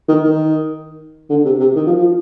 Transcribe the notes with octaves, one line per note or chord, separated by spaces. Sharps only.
D#3
D#3
D3
C3
C3
D#3
F3
F3